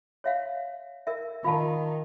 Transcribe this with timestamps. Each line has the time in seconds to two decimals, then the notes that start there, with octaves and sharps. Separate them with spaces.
0.24 C#5 E5 F5
1.07 A#4 E5
1.44 D#3 F4 F5 A5